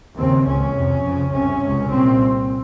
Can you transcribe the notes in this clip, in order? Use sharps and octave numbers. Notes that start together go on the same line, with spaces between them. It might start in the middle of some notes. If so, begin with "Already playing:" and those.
D#2 C#3 C4
C#2 C#3 C#4
F2 C3
F2 C#3
C2 C3 C#4
C#2 C3
C2 A#2 C4